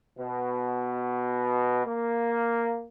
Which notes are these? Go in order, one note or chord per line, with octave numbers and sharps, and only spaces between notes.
B2
A#3